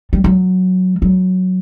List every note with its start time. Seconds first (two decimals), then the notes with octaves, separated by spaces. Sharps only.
0.13 G3
0.24 F#3
1.02 F#3